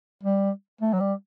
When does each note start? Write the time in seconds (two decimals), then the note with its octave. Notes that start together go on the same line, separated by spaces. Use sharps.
0.23 G3
0.81 A3
0.93 F#3
1.00 G3